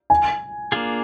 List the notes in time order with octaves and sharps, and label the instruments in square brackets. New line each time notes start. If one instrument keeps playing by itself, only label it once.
[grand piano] G#5
[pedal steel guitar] A#3 D4 F4 G#4